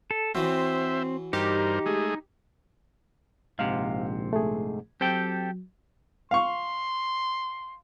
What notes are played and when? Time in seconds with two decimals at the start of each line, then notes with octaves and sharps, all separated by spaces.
0.11 A4
0.35 E3 F#3 C4 C5 E5
1.33 G2 D#4 G4 A#4 C5
1.86 G#3 A3 G#4
3.59 A#1 G#2 C3 F5
4.33 A3 G#4
5.01 F#3 C4 G4 A4 G5
6.31 F5 C6 C#6